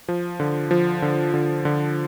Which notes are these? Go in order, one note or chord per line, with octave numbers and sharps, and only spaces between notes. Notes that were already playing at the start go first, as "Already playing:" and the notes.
F3
D3
F3
D3
D3
D3